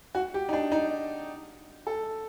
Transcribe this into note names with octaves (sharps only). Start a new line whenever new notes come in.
F#4
G4
D#4
D4
D#4
A4